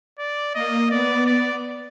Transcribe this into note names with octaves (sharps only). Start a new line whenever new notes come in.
D5
A#3 D#5
B3 D5
D5